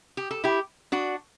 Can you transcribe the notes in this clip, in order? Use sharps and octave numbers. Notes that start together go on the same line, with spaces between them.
G4
A4
E4 G4
D4 F#4